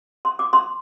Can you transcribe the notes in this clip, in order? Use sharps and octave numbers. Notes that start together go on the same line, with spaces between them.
C6
D6
C6